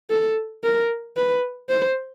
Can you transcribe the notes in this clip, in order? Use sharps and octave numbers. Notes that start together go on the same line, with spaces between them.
A4
A#4
B4
C5